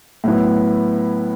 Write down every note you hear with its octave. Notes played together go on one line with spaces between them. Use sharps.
A2 F#3 B3 E4